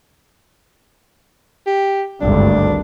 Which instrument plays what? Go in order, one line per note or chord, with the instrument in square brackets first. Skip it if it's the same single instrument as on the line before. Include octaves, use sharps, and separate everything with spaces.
[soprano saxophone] G4
[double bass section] G#1 D2 G2 [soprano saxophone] D4